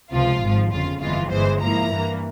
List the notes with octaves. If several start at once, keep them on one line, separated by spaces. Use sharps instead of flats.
C#2 C3 F3 F4
G#1 G#2 F3
G1 F2 C#3 F4
G1 F2 E3 G#3 F4
G1 G2 E3 G#3 C5
G#2 F3 A#3 E4 A#5
G2 E3 A#3